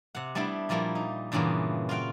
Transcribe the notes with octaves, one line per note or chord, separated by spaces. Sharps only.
C3 F#5
G3 A3 B3 D4 E4
A#2 F3 G3 A#3 E4
D#4
G2 A#2 C#3 E3 A#3 B3
F4 F#4 F5 G5